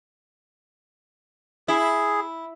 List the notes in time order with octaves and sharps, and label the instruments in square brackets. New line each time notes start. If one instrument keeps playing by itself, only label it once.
[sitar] E4 [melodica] G#4